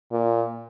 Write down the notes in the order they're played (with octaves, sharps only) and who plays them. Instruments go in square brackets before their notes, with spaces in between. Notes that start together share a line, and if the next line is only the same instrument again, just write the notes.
[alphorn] A#2